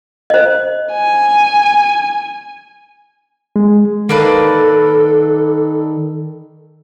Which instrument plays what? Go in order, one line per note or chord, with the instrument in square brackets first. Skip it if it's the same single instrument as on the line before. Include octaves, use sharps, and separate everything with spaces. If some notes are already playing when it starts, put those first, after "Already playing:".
[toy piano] C5 D#5
[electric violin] G#5
[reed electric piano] G#3
[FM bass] D#3 [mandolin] A#3 D4 B4 [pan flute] A4